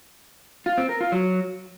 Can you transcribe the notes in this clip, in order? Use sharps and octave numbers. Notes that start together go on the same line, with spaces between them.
F4
C4
A#4
F4
F#3